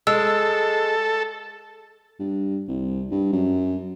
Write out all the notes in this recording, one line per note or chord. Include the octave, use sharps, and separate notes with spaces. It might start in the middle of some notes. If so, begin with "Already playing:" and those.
G#3 A4 E6
G2
C2
G2
F#2